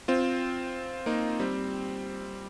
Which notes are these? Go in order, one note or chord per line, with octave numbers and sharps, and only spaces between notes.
C4 F4
A#3 D#4
G3 C4